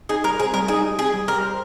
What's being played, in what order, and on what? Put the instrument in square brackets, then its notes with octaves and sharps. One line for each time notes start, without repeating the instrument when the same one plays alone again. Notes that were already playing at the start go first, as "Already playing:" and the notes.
[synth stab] D#4 [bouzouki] G#4
[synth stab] G3 [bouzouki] A#4
[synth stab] C4 [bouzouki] G#4
[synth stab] G3 [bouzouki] A#4
[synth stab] D#4 [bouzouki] G#4
[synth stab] G3
[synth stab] C4 [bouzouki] G#4
[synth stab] G3
[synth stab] G4 [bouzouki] A#4
[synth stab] C5